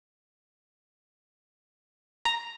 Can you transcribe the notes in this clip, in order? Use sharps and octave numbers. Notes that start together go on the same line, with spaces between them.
A#5